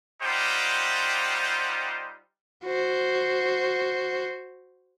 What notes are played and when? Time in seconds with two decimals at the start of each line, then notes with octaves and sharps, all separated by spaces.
0.23 G3 D#4 F4 G4 C5 F#5
2.65 F#4 C5